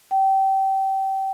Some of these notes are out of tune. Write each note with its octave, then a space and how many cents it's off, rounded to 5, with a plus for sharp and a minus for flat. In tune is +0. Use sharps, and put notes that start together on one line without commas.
G5 -25